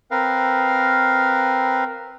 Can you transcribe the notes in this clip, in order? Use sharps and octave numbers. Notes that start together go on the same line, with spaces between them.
C4 A#4 B4 F5